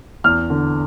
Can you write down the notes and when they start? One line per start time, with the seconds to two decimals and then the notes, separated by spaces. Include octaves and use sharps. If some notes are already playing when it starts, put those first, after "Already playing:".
0.24 E2 F6
0.50 D3